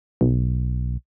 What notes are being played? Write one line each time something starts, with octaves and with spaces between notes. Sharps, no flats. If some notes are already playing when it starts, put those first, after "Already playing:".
B1